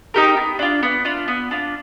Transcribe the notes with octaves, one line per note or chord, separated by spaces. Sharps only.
D#4 G4 A#4
B3
D4 F4
B3
D4 F4
B3
D4 F4